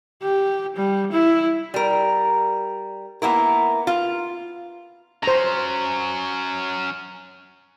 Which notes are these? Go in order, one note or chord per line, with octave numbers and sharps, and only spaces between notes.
G4
G3
E4
G3 A#4
A#3 B3 E4 A#4
F4
F#3 C#4 C5 A#5